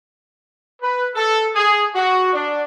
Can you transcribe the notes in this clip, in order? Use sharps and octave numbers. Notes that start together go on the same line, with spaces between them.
B4
A4
G#4
F#4
D4